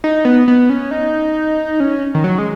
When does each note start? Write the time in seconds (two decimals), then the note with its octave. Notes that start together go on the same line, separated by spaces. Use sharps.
0.04 D#4
0.25 B3
0.48 B3
0.70 C#4
0.91 D#4
1.80 C#4
2.14 D#3
2.24 F#3
2.38 G#3